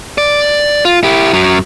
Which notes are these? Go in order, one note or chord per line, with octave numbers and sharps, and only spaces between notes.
D5
F4
E4 G4
F#2 F#3